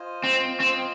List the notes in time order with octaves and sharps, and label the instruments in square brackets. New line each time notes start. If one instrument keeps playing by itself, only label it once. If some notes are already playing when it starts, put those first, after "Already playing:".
Already playing: [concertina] F4 C5 D#5 G#5
[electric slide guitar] C4
C4